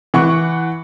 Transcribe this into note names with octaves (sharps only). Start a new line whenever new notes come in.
E3 F#5 C#6